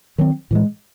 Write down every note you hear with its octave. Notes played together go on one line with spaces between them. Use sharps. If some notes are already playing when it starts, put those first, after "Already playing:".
D#3 F#3 C4
A2 E3 G#3